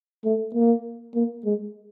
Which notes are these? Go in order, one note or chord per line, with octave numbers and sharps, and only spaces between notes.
A3
A#3
A#3
G#3